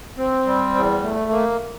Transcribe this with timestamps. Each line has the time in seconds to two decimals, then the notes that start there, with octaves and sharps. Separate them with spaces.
0.18 C4
0.46 G3
0.75 E2
1.03 A3
1.31 A#3